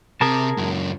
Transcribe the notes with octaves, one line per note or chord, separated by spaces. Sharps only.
C3 G#4 A#4 A5
C#2 F#2